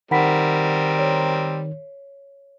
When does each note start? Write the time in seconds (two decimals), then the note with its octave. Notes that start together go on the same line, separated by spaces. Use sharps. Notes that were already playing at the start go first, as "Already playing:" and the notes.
0.11 D#3 G3 C4 A#4 F#5 B5 B6
0.99 C#5